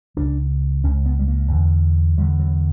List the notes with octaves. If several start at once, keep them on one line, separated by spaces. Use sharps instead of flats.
C#2 C#3 D4
C#2 C#3 C#4
B3
G3
A#3
E2 D3
E2 D3 G3
F#3